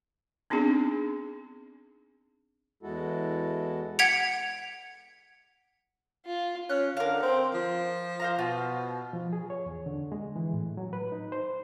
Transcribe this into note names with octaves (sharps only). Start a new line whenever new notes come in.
B3 C4 D4 D#4 G#4
E2 G#3 E4 F#4 A4
F#5 G#6 B6 C#7 D7 F7
F4
C#4 F#6
D3 A#4 F5
C4
F3
C5 F5 A#5
B2 F4
F3
G#4
C#5
E2
D3
G#3
E3
A2
F#3
B4
D#4
C5